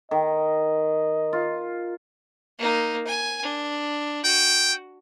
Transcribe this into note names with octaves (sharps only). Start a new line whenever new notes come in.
D#3 D#5
F4
A#3 D#4
G#5
D4
F#4 G5